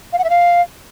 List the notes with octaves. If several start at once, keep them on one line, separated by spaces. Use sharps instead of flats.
F5
F#5
E5
F5